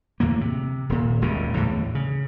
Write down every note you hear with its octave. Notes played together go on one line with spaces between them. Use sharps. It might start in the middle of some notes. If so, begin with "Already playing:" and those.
E2 A2 D3 A#3
C3
D#1 A#2
D#1 C#2 A2 C#3
E2 A2 D3 G3
C#3